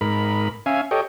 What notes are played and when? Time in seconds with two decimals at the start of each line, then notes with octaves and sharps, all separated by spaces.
0.01 G#2 A#4 B5
0.66 C#4 E5 F5 G#5
0.91 G4 A4 C#5 D#5 G5